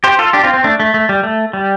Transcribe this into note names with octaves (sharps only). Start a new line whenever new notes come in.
G4 C5
F4 A4
D4 G4
C4 F4
C4
A3 D4
A3
A3
G3
A3
G3